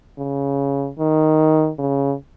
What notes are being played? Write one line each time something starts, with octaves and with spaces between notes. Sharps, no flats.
C#3
D#3
C#3